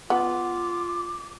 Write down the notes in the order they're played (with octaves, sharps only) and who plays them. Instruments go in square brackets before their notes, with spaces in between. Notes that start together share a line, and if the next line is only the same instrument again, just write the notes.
[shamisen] B3 [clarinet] F4 [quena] D6